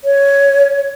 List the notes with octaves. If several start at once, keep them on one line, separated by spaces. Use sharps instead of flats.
C#5